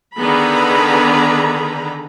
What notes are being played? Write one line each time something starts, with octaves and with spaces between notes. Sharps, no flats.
D3 D#3 B3 G#4 A#5 B5